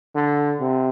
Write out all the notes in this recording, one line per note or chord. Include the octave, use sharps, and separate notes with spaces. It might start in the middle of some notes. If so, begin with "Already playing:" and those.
D3
C3